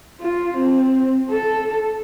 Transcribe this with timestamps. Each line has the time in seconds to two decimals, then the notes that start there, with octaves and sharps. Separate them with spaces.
0.20 F4
0.56 C4
1.30 A4